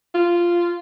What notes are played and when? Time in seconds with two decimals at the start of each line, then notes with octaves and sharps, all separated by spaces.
0.15 F4